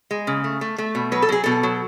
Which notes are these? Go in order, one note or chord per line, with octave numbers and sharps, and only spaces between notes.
G#3
C#3
A3
A3
A3
B2
F#3 B4
A4
F#3 G#4
B2 A4
F#3